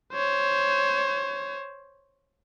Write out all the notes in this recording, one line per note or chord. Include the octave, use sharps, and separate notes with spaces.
C5 C#5